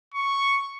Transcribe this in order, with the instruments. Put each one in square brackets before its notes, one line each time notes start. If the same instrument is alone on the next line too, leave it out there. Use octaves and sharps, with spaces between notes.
[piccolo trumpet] C#6